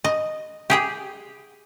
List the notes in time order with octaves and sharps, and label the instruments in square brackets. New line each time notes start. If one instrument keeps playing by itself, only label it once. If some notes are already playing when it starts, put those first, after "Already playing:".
[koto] D#5
G4 G#4 G5